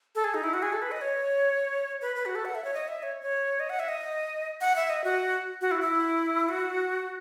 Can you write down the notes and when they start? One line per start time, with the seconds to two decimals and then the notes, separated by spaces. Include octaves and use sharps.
0.15 A4
0.24 G#4
0.34 D#4
0.44 E4
0.54 F#4
0.62 G#4
0.73 A4
0.82 B4
0.91 D#5
1.01 C#5
2.01 B4
2.16 B4
2.26 F#4
2.35 A4
2.45 F#5
2.55 E5
2.64 C#5
2.74 D#5
2.88 E5
3.03 C#5
3.22 C#5
3.60 D#5
3.70 F#5
3.79 E5
3.88 D#5
4.61 F#5
4.76 E5
4.90 D#5
5.04 F#4
5.61 F#4
5.71 E4
5.81 E4
6.48 F#4